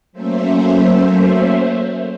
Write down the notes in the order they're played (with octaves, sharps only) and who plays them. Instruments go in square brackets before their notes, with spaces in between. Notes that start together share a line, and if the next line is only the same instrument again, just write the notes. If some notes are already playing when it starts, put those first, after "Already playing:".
[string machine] F#3 A3 A#3 C#4 C5 E5